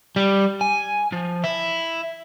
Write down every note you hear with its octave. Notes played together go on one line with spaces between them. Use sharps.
G3
G#5
F3
E4